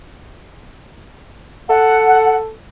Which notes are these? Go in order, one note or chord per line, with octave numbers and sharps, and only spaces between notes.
A4 F#5